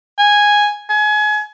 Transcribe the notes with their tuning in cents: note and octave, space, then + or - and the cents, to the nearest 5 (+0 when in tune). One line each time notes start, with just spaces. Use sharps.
G#5 -5
G#5 +30